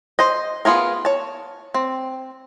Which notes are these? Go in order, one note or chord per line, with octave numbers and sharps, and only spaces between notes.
C5 D#5
B3 F4 G#4 A#4
C#5 A5
C4